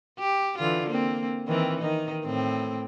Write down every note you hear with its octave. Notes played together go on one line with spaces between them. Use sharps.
G4
D3 E3 F4
A#3 C4
D#3 E3 C4
D#3 D#4
A2 C4